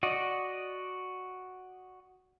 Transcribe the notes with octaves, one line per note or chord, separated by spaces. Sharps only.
F#4 D5 D#5